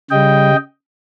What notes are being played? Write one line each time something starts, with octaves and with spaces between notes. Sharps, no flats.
C#3 G3 D#5 G5